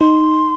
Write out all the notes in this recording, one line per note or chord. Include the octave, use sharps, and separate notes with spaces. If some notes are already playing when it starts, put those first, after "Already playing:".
D#4 C6